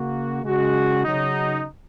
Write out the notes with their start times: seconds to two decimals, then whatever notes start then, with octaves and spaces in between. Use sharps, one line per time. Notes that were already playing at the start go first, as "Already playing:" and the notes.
Already playing: C#3 A#3 F#4
0.43 C#3 G#3 F#4
1.04 C#3 F#3 D#4